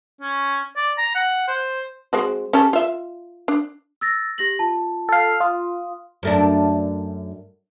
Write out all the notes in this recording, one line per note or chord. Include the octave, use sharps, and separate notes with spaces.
C#4
D5
A#5
F#5
C5
G#3 C4 F#4
C#4 G4 A4
F4 E5
D4
E6 A6 A#6
G4 A#6 F#7
F4 A5
A4 F5
F4 D#6
F#2 A3 D4